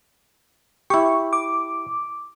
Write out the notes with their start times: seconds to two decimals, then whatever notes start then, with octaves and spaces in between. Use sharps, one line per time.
0.90 E4 G4 C#6
1.33 D6